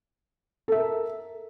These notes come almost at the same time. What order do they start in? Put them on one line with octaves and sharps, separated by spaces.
A4 E5 A#4